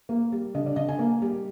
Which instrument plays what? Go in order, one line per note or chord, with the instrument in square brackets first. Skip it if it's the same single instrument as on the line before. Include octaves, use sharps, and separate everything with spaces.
[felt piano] A#3
G3
D3 D#5
D5
D3 D#5
G#5
A#3
G3